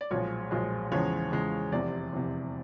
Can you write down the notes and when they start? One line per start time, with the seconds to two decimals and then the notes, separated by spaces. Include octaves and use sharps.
0.01 D5
0.11 B1 A#2 F3 G#3 C#5
0.51 B1 A#2 F3 G#3
0.92 E2 C#3 F3 G#3 C#5
1.32 E2 C#3 F3 G#3
1.72 F1 E2 C3 D5
2.12 F1 E2 C3